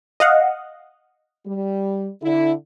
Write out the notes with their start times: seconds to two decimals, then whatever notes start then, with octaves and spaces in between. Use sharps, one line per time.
0.20 D#5 F5 F#5
1.46 G3
2.22 D3 E4